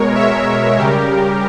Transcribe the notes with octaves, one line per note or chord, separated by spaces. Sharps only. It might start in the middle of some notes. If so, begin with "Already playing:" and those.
Already playing: B2 G#3 A#4 C#5
C#5 E5
C#3 G3 G4 A#4